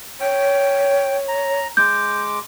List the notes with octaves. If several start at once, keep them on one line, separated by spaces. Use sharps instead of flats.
C#5 G5
A#5
G#3 D6 G6